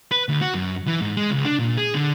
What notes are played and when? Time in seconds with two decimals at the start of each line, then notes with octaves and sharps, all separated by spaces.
0.11 B4
0.29 D2
0.41 F#4
0.54 F#2
0.87 E3
1.01 G#2
1.17 G#3
1.31 C#2
1.45 D4
1.59 A#2
1.77 G#4
1.95 D3